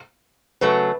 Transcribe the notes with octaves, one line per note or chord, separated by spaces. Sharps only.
C#3 F#3 A3 B4